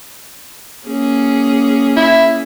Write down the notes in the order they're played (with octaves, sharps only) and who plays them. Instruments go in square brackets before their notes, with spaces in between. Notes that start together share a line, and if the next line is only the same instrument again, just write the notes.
[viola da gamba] A#3 C#4 G#4
[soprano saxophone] E4